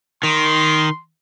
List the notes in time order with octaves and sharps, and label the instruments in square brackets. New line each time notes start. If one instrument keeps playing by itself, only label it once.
[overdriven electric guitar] D#3 [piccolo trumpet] C6